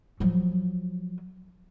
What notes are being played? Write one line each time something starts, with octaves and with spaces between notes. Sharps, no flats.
F3 F#3